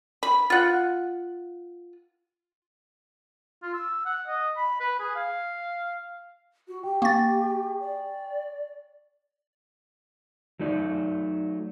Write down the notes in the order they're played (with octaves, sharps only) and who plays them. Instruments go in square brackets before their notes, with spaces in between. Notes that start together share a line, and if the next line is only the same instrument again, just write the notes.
[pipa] B5
F4 F#5
[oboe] F4
E6
F#5
D#5
B5
B4
G#4
F5
[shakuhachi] F#4
[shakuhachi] G4 [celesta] G5
[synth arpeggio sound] A#3 A6 [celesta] G5 G#5 C#6
[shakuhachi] D5
[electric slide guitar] F#3 A3 D#4 D5